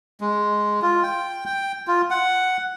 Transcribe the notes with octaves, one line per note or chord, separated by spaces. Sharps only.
G#3
F4
G5
G5
F4
F#5